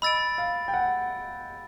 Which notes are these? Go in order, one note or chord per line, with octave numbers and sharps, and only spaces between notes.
D#5 B5 E6 A6 D7
F5
G5
F#5